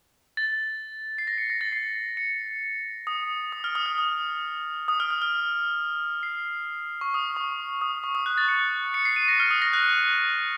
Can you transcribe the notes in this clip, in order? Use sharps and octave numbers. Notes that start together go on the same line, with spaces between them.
A6
C7
A#6
C#7
A#6
A6
C7
C#7
D#6
D#6
F6
D#6
F6
D#6
D#6
F6
F6
F6
C7
C#6
D#6
C#6
D#6
C#6
D#6
F#6
A6
C#7
C#7
C7
D#7
A#6
F6
D#6
A#6
F#6